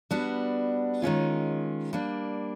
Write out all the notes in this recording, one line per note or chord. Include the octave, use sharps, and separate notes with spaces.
G3 B3 D4 F#4
D#3 G#3 C#4 F4
G3 A#3 D4